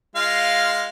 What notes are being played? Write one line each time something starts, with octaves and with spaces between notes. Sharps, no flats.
G#3 F4 F5